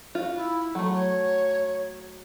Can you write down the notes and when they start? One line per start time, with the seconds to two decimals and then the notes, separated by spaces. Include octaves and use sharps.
0.15 F4 F#4
0.35 E4
0.75 F#3 A3 C#6
0.93 C#5